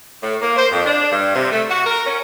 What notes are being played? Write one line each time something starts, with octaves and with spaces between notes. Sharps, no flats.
A2
A#3
C5
F2
D4
G2
C3
A3
F#4
A#4
C#4